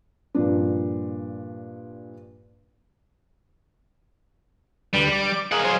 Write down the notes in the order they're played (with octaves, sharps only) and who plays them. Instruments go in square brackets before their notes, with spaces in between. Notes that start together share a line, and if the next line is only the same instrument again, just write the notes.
[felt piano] G2 A#2 F3 D4
[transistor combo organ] D2 G4 B4 [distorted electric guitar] G3
[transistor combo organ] D6
[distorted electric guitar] A#3 F#5 [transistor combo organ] G#4 D#5 F5
[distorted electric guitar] F#3 C5